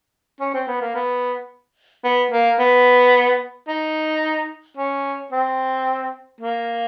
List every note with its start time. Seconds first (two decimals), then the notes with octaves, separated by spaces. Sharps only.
0.40 C#4
0.54 C4
0.67 B3
0.81 A#3
0.95 B3
2.04 B3
2.31 A#3
2.59 B3
3.68 D#4
4.77 C#4
5.32 C4
6.41 A#3